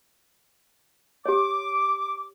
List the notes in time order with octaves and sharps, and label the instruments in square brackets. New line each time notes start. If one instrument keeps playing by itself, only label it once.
[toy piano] G4 C#5 [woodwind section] D6